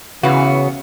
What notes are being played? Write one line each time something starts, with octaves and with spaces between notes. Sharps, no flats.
C#3 E3 B3 C#4 F#4 F5